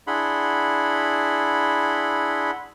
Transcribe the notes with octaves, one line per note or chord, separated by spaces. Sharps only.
D4 E4 G#4 F#5 B5 C6